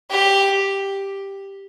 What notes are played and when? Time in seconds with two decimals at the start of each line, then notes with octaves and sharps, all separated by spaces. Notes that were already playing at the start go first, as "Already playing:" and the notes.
0.10 G4